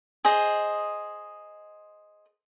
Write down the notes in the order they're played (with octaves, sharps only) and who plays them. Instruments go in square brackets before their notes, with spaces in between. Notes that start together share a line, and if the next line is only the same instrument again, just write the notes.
[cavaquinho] G#4 C5 D#5